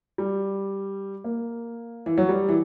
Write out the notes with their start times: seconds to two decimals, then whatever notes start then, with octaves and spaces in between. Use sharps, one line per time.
0.18 G3
1.24 A#3
2.06 E3
2.18 F#3
2.29 G3
2.49 E3